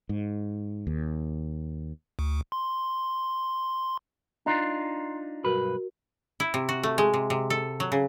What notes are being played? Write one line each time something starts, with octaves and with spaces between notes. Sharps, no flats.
G#2
D#2
D2
C6
D4 D#4 F4 A#5 C6 C7
B1 G2 F#4 A#4 B4
E4
C3
F#4
A3
G#3
C3
C3
A4
F#3
C#3